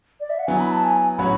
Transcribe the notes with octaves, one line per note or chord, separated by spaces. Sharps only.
D5
E5
F#5
F#3 B3 E4 G#5
B5
A5
G#5
A2 F#3 C#4 F#4 C#5 B5